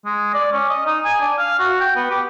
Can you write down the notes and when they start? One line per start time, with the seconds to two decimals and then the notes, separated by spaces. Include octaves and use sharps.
0.05 G#3
0.34 D5
0.53 C#4
0.70 D#5
0.86 D#4
1.05 G#5
1.20 D4
1.38 F5
1.59 F#4
1.80 G5
1.96 B3
2.10 G4